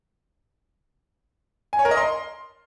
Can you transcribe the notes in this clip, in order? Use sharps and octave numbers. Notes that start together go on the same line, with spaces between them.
G#5
C#5
A#4
D#5
C6